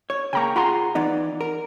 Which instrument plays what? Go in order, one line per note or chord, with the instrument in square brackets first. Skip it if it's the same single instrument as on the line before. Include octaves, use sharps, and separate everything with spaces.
[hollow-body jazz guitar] C#5
[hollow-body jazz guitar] C#3 A#3 [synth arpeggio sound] G5 A#5 C#6
[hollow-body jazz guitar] F4 G#4 [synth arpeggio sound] F#5 A#5 C6
[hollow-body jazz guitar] E3 B3 D#4 [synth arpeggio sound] D5
[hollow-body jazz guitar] A#4